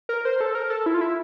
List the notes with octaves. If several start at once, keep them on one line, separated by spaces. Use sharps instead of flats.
A#4
C5
A4
A#4
A4
E4
F4
E4